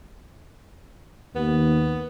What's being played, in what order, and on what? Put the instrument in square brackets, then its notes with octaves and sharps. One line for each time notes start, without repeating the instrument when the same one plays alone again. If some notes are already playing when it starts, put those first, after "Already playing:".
[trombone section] D#2 [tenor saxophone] B3